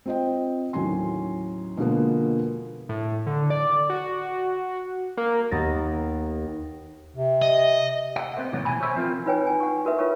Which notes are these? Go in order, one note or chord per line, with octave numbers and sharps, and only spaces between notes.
C4 F4 C5 D#5 G5
D#2 A2 F#3 C#4 G#5 C6
B2 D3 F3 G#3 A#3 B3
A2
D3
D5
F#4
A#3
D#2 B3 D#4 A6 A#6
C3
D#5
E5 F#5
B3 C4 B4 C5
D#2 A2 C3 F#3 C#5 F#5
B2 E3 G#5 B5
F#4 C5 C#5 E5
F3 C4 F4 A#4
D#4 F4 B4 C#5 G5 G#5
G#5
F#5 C#6
F#4 A#4 B4 E5
F4 A#4 B4 C#5 C#6